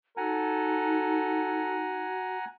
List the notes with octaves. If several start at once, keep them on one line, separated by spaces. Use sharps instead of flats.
D#4 F#4 A4 F#5 G#5 A#5